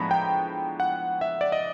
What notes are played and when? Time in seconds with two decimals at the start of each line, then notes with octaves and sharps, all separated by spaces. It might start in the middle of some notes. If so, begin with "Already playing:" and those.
Already playing: A2 F3 G#3 B3 D4 A#5 B5
0.11 G5
0.80 F#5
1.21 E5
1.41 D5
1.52 D#5